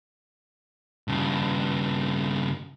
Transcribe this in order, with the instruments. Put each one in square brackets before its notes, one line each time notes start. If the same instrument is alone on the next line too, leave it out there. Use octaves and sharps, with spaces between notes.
[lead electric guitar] G2 C#3